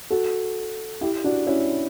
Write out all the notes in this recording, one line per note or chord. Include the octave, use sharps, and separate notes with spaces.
F#4 A4
E4 G4
D4 F#4
C#4 E4